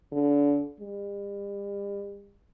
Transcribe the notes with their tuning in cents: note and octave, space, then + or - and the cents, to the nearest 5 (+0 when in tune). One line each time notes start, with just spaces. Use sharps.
D3 -30
G3 +40